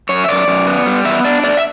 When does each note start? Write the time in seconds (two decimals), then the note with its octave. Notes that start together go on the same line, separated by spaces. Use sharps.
0.09 F#2 C#5
0.24 E5
0.28 F#2 D5
0.48 F#2
0.67 B3
0.86 G3
1.05 B3 E5
1.24 D4 D5
1.44 A3 D5
1.57 E5